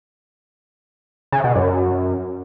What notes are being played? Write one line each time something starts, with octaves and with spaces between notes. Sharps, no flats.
C#3
B2
F#2